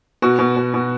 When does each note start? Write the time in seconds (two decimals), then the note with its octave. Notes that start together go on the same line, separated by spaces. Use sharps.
0.22 B2 F#4
0.39 B2
0.57 B2
0.74 B2